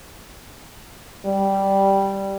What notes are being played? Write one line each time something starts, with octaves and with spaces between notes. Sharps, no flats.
G3